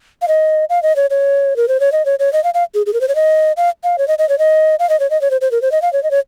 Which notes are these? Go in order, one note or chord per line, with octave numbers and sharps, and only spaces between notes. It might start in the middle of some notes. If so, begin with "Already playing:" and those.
F5
D#5
F5
D#5
C#5
C#5
A#4
C5
C#5
D#5
C#5
C#5
D#5
F5
F5
G#4
G#4
A#4
C5
C#5
D#5
F5
F5
C#5
D#5
D#5
C#5
D#5
F5
D#5
C#5
D#5
C#5
C5
C5
A#4
C5
D#5
F5
C#5
D#5
C#5